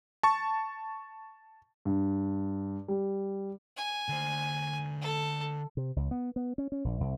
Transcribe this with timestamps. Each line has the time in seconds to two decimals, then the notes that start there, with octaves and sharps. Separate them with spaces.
0.23 A5 C#6
1.85 G2
2.88 G3
3.77 G#5
4.09 D3 C5
5.02 A4
5.77 C3
5.96 C#2
6.11 B3
6.36 B3
6.58 C#4
6.72 C#4
6.84 A#1
7.00 C2